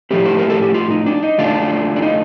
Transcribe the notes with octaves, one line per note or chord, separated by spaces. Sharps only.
A2 F3 A3 C4 G4
C5
A#4
A4
G4
F4
D#4
D4
D#4
F2 D3 A3 D4 F4
D4
D#4